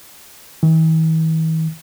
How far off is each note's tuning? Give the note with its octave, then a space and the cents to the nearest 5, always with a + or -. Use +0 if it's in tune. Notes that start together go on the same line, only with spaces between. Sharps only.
E3 -45